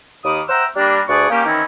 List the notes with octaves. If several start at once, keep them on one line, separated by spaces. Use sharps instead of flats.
D#2 D#3 B5 D6 D#6
C5 E5 F#5 G5 A#5 E6
G3 A#3 D4
D2 G#4 B4 D5 A5 C#6
A#3 C#4 G4
D#3 E3 C4 C#4 D#4 E4